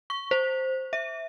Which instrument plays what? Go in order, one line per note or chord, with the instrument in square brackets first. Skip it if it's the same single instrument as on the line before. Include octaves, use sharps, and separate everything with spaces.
[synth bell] C#6
C5
E5